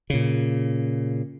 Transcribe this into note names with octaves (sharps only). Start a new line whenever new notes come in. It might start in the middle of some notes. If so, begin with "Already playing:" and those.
A#2 C#3